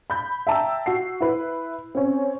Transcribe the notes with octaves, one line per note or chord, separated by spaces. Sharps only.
B5 G6
E5 G5 A5 A#5 E6
F#4 F#5 C7
E4 B4
C4 C#4